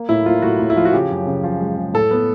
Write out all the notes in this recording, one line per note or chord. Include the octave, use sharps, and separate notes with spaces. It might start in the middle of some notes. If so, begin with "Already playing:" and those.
Already playing: A#3
A2 E4
A#3 F4
A2 F#4
A2
E4
F3 F4
F#4
C#3 G4
F#2
C#3
F3
G#3
C#3
A2 A4
B3